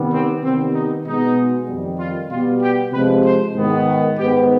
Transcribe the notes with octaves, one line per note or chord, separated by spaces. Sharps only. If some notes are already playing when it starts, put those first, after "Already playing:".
Already playing: C3 D#3 G3 B3
C4
C3 D#3 G3 B3 C4
D#4
B2 G#3 B3 D#4
F2 D#3 G3
F4
B2 G3 B3 F4
G4
C3 F3 G#3 B4
C5
G#2 D#3 B3
G#2 D#3 B3 G4